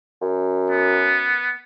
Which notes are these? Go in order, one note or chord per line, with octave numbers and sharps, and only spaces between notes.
F#2
B3